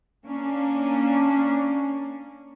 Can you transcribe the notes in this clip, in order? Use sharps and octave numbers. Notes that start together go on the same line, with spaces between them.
A#3 C#4 D4